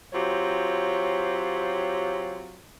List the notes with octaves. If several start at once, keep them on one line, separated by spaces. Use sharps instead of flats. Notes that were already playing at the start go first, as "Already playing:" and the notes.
F#3 C4 F4 G4 C#5